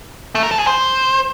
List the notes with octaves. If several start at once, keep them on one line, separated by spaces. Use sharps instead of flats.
A3
A#4
A4
G#4
C5